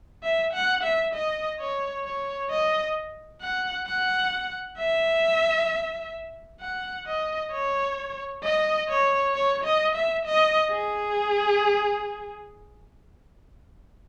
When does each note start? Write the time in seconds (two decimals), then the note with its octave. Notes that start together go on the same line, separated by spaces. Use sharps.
0.23 E5
0.54 F#5
0.84 E5
1.14 D#5
1.60 C#5
2.05 C#5
2.50 D#5
3.42 F#5
3.87 F#5
4.78 E5
6.61 F#5
7.07 D#5
7.52 C#5
8.43 D#5
8.89 C#5
9.34 C#5
9.65 D#5
9.95 E5
10.26 D#5
10.71 G#4